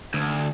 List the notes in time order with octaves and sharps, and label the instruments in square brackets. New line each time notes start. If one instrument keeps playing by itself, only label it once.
[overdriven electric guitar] D2